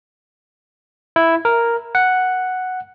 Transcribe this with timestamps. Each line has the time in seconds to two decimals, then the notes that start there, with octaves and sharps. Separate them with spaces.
1.16 E4
1.45 A#4
1.95 F#5